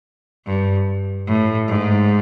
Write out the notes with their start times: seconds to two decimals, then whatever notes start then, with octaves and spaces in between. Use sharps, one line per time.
0.46 G2
1.27 A2
1.68 G#2